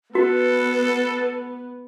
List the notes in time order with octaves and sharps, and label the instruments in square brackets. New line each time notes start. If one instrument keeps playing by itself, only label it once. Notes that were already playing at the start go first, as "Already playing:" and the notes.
[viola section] B3 [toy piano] F#4 [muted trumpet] A4 [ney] B4